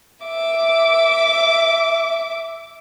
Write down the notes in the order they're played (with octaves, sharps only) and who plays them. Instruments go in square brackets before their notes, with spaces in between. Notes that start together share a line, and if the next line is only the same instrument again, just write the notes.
[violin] E5 D6